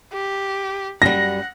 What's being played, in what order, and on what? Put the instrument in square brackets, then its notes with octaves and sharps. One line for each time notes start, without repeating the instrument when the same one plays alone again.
[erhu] G4
[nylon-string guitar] F#2 G3 [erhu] F#5 [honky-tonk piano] A#6